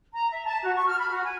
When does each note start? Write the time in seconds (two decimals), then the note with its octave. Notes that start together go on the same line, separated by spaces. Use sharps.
0.12 A#5
0.31 E5
0.45 A5
0.63 F#4
0.75 C#6
0.87 F6
0.99 B5
1.11 F#4
1.24 G#5